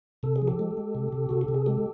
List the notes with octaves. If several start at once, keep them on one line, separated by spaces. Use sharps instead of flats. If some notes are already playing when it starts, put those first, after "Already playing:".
C3 A4
G#4
F3
G4 A4
G#3
G#3
C3
C3
C3 F#4
G4
C3
G#4
G#3 G4 A4